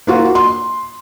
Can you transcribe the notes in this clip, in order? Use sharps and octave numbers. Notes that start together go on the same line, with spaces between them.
A#3 F4 F#4
C6